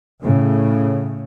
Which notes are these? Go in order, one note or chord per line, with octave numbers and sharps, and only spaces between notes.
A2 C#3